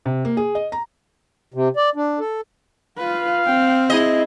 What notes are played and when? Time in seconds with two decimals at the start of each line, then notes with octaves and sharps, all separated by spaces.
0.06 C3
0.25 A#3
0.37 G#4
0.55 D#5
0.72 A#5
1.54 C3
1.76 D5
1.95 D4
2.19 A4
2.98 F4 B4 F5
3.46 C4 G5
3.90 E4 G#4 D#5